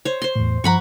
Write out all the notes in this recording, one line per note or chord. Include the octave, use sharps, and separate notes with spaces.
C5 C#5
C5 C6
E2 A2
G2 F3 F#5 A#5 B5 C#6